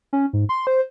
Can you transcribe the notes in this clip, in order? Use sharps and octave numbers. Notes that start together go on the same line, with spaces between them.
C#4
G#2
C6
C5